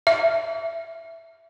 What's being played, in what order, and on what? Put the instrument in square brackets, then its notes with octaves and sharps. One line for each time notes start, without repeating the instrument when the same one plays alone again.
[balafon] E5